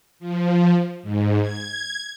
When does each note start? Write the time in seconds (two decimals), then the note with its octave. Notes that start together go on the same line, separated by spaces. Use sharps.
0.19 F3
1.03 G#2
1.41 G#6